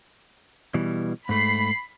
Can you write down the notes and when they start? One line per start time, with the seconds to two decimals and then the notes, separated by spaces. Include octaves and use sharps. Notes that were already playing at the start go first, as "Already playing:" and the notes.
0.74 B2 E3 G3
1.29 G#2 A3 B5 C7